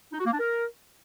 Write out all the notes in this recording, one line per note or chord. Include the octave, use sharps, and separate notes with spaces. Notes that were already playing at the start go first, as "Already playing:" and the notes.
D#4
F#4
A#3
D4
A#4